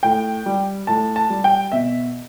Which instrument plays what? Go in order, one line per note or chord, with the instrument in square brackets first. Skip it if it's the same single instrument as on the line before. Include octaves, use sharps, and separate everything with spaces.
[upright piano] A2 G5
G3
A2 A5
A5
G3
G5
B2 E5